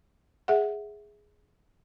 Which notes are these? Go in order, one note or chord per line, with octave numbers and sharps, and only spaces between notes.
G#4 E5 F#5